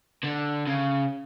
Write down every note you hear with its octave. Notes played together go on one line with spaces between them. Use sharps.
D3
C#3